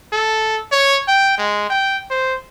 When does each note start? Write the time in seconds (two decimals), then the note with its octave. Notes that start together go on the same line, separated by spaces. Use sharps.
0.13 A4
0.72 C#5
1.08 G5
1.38 G#3
1.70 G5
2.11 C5